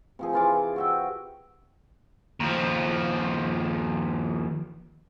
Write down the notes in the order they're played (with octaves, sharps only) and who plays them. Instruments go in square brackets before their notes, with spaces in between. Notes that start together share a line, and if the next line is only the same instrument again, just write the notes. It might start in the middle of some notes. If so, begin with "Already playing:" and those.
[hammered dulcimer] C3 F3 G#4
E3 F4 D6
F#4 E5 G5
[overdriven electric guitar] D#2 F3